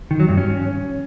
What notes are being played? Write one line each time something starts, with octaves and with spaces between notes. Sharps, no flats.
D#3
F#3
G2
C#4